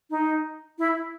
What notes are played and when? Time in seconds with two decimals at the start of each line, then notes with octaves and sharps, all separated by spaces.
0.10 D#4
0.78 E4